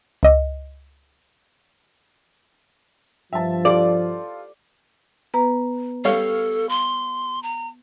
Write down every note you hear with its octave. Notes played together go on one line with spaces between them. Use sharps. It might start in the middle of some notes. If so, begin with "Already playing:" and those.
C#2 D#5
G2 F3 E5 A5
F4 G4 A4 D5
B3 B4 A#5
G3 A4 C#5 F5
C6
A#5